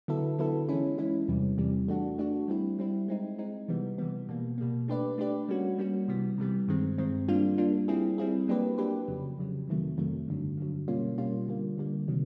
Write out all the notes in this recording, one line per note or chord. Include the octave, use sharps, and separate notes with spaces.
D3 F#3 B3 E4 A4
D3 F#3 B3 E4 A4
E3 G#3 C#4 E4
E3 G#3 C#4 E4
E2 C3 E3 G3
E2 C3 E3 G3
A3 D4 F#4
A3 D4 F#4
G3 C4 E4
G3 C4 E4
G#3 C4 D#4
G#3 C4 D#4
C3 E3 G3 B3
C3 E3 G3 B3
B2 G3 A#3
B2 G3 A#3
A3 D4 G4 B4 D5
A3 D4 G4 B4 D5
G3 A#3 C#4 F#4
G3 A#3 C#4 F#4
C3 E3 G3 B3
C3 E3 G3 B3
G2 D#3 G#3 C4
G2 D#3 G#3 C4
G3 A#3 D4 F4
G3 A#3 D4 F4
G3 C4 E4 G#4
G3 C4 E4 G#4
F#3 A#3 D4 G4 B4
F#3 A#3 D4 G4 B4
F2 C#3 F#3
F2 C#3 F#3
F2 C3 D#3 F#3 A3
F2 C3 D#3 F#3 A3
G2 D3 F#3
G2 D3 F#3
B2 G3 A#3 C#4 F4
B2 G3 A#3 C#4 F4
D3 G3 A#3
D3 G3 A#3
C3 D#3 F#3